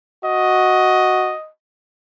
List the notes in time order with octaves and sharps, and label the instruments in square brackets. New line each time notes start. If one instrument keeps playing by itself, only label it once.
[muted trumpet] F#4 [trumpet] D#5